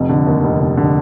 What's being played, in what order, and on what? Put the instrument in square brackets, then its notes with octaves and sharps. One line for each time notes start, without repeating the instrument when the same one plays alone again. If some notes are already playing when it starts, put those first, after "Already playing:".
Already playing: [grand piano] F1 F2
D3
D#2
F1
F1
D3